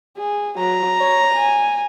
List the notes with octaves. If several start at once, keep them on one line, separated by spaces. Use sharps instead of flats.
G#4
F#3 A#5
C#5
G#5